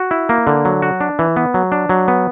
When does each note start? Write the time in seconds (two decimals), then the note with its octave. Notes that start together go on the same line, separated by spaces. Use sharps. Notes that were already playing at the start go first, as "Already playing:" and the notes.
Already playing: F#4
0.11 E4
0.29 A#3
0.47 D3
0.65 F#3
0.82 F#4
1.01 D4
1.19 E3
1.36 B3
1.54 F#3
1.72 D4
1.89 F#3
2.08 B3